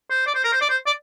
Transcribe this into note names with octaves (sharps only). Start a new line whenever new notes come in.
C5
D5
C5
A#4
C5
D5
C5
D5